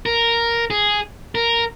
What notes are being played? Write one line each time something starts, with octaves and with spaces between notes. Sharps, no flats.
A#4
G#4
A#4